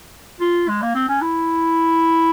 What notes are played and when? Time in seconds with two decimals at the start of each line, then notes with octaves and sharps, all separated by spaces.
0.41 F4
0.68 G#3
0.82 A#3
0.95 C4
1.09 C#4
1.22 E4